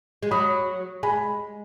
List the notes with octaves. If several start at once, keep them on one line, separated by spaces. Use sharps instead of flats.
G#3
F#3 B5 D#6
G#3 G#5 B5